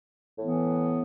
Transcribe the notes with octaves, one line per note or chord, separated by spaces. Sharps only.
A2 E3 B3